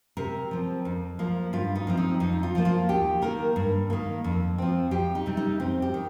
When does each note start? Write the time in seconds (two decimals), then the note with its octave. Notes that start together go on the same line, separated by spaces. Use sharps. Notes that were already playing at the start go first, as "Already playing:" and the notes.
0.17 C3 A#4
0.51 F3 C4
0.85 F2
1.19 F3 A#3
1.53 G2 F4
1.76 D#4
1.87 F3 C4
1.97 D#4
2.20 F2 D#4
2.43 F4
2.55 F3 A#3
2.65 F4
2.89 D#2 G4
3.22 D#3 A#3 A#4
3.56 G2
3.90 D#3 A#3
4.24 F2
4.58 F3 C4
4.91 F2 G4
5.15 D#4
5.26 C3 G3
5.37 D#4
5.60 F2 C4
5.82 G4
5.94 D#3